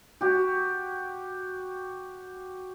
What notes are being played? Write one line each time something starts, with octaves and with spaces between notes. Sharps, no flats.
F#4 G4